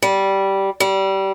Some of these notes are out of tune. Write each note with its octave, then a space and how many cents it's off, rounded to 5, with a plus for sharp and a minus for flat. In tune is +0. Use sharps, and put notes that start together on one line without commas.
G3 -10
G3 -20